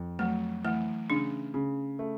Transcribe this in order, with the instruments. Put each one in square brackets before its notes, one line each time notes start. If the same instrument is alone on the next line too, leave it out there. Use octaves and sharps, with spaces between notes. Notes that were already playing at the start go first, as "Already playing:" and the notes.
Already playing: [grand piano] F2
[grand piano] F#3 [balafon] A3
[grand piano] E3 [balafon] A3
[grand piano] C#3 [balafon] D4
[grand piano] C#3
A3